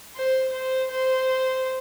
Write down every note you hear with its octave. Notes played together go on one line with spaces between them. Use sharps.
C5
C5
C5